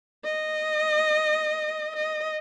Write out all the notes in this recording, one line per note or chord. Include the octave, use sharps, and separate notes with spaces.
D#5
D#5